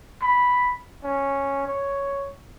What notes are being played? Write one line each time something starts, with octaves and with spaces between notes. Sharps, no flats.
B5
C#4
C#5